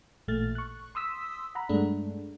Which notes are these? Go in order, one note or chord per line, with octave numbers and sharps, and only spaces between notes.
A1 A#2 A3 F6 A6
C#6 F#6
C6 D#6 E6 B6
F#5 A#5 B5
G2 G#3 A3 D4